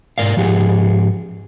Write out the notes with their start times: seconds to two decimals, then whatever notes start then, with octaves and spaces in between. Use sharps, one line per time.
0.18 G#2 A#4 D5 F5
0.36 G#2 F3 G4 G#4 F#5